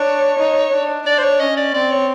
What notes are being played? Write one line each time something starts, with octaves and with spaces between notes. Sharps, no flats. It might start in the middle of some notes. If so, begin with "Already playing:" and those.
Already playing: D4 C#5
D#4
D4
D4 D5
C5
C#5
C#4 D#5
D5
C4 D5
C#5